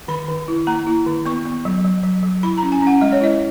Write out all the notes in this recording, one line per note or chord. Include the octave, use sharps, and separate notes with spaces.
D#3 B5
D#3
E4
A#3 A#5
E4
D#3
B3 C#6
B3
F#3
F#3
F#3
F#3
E4 B5
A#5
C#4
G#5
C#4 F#5
G#3 D#5
C#5
E4 D#5